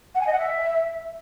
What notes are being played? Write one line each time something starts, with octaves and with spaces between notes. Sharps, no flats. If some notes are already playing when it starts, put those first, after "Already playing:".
F#5
G#5
D#5
F#5
E5